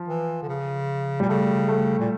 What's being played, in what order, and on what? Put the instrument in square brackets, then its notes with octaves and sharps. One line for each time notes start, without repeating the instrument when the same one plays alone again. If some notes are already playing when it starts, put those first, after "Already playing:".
Already playing: [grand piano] F3
[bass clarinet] E3
D3
C#3
[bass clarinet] A#2 [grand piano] G3
[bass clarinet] C#3 [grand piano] A3
[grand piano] A3
[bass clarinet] A#2